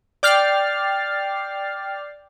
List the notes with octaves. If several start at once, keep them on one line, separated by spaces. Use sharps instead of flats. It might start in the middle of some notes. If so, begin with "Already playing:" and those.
D5 G5 F6 A6 C7